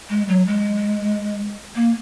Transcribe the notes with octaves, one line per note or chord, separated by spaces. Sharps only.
G#3
F#3
G#3
A#3